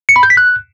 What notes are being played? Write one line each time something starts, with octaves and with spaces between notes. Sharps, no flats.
C#7
B5
G6
B6
F#6